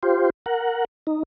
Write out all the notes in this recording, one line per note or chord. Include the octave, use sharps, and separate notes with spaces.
F4 G4 C5
A#4 F#5
D#4